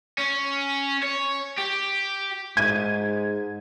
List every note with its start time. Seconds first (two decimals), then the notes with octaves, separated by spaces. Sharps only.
0.18 C#4
1.03 C#5
1.59 G4
2.57 G#2 G#6 D#7